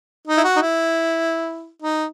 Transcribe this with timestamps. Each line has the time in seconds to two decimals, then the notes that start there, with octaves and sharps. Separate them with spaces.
0.27 D#4
0.37 E4
0.44 F#4
0.56 D#4
0.62 E4
1.82 D#4